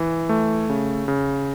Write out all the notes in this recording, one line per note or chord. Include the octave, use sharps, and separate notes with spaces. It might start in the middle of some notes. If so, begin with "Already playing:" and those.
Already playing: E3
A3
C#3
C#3